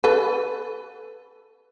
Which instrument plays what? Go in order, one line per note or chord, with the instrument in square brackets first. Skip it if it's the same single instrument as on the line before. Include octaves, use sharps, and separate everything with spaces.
[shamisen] A4 B4